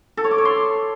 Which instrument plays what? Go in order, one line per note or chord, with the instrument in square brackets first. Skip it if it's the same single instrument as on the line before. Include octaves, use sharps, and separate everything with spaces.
[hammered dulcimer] A4
C#5
D6
C#5
C6